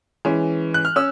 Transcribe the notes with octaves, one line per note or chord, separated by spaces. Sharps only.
E3 G#3 C#4
F#6
F6
C#4 E6